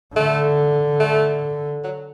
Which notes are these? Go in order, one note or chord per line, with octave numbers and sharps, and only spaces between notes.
D3 A3
A3
F#3